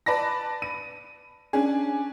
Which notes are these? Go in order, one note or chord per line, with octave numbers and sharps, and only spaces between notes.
B4 D5 A5 A#6
D#7
C#4 D4 G#4